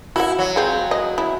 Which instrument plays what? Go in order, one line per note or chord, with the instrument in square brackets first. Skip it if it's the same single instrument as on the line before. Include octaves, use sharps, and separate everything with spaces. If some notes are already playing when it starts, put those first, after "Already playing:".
[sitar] E4 [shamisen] F#4 F#5
[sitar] F#3
[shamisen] G#3 C4 F4
D#5
E4